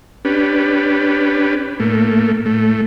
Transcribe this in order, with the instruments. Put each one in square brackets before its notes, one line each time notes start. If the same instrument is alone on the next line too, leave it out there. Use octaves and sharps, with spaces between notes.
[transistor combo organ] C#4 D4 G4 B4
A2 A3 A#3
A2 A3